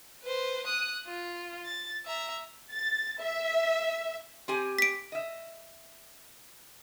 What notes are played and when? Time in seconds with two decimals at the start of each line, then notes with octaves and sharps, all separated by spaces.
0.23 B4 C5
0.67 D#6 F#6
1.07 F4
1.66 A6
2.06 E5 A#5
2.72 A6
3.19 E5
4.48 C4 G4 G#5
4.79 B6 D7
5.12 D#5 E5